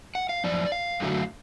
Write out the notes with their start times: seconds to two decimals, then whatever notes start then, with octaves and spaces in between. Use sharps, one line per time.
0.15 F#5
0.29 F5
0.44 F#2 F3 D5
0.72 F5
1.00 F#2 D3 F#3 A3